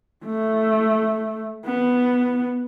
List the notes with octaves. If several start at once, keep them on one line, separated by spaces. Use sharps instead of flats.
A3
B3